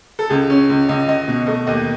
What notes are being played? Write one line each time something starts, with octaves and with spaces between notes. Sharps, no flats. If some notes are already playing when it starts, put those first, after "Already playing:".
A4
C#2 G#4
C#4
C#2
C#2 D#5
C#2 D#5
B2
A3 D#5
D#2 D#5